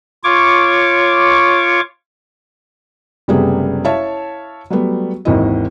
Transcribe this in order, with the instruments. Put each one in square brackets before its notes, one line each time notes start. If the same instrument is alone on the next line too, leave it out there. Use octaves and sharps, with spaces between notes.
[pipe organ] F4 C#5 C#6 D6
[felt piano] F#1 C3 G3 A3 B3 G#4
E4 C#5 E5 F5 A5
F#3 G3 A3 B3
G#1 D#2 E3 E4 D#5